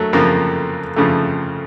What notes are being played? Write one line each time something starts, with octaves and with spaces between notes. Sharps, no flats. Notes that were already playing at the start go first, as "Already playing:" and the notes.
Already playing: F#3 A3 A#3
F2 C#3 F3 A#3
F2 C#3 F3 A3